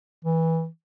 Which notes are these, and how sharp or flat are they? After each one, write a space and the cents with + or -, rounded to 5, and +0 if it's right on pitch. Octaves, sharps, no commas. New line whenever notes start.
E3 -15